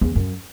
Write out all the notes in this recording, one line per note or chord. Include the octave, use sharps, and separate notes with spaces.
E2
F#2